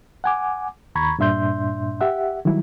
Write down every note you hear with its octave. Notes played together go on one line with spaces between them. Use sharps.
F#5 G#5 D6
D#2 A#5 B5 C#6 G#6
G2 A#2 D4 E5 C6 G6
G4 E5 F#5
D#3 F#3 G3 E4